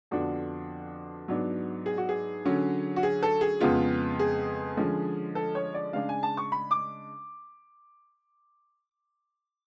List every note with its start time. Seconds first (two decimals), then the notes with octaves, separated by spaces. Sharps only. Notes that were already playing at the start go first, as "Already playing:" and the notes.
0.11 F2 D3 F3 B3 D4 F#4
1.28 G#2 F#3 B3 D4
1.86 G#4
1.98 F#4
2.09 G#4
2.45 D3 F#3 C#4
2.96 F#4
3.03 G#4
3.23 A4
3.41 G#4
3.61 F2 C#3 G#3 B3 F4
4.19 G#4
4.77 D3 F3 G#3 C#4
5.35 A4
5.55 C#5
5.74 D5
5.93 C#3 G#3 D4 F5
6.09 G#5
6.23 A5
6.37 C#6
6.52 B5
6.71 D6